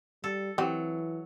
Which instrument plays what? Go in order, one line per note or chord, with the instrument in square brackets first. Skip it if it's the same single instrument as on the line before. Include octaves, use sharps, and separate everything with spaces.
[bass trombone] G3 [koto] A4
[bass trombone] E3 [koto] F#3 [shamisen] C4 G4